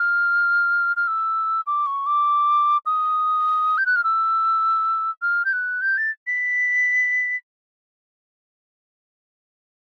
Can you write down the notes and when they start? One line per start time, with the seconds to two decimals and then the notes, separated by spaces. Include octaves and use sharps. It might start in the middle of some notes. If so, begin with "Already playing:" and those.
Already playing: F6
0.96 F6
1.08 E6
1.67 D6
1.86 C#6
2.06 D6
2.86 D#6
3.78 G6
3.86 F#6
3.96 F6
4.04 E6
5.22 F6
5.45 G6
5.53 F#6
5.81 G6
5.97 A6
6.27 B6